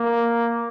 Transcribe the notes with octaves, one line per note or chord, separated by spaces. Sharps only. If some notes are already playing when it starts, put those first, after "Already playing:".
Already playing: A#3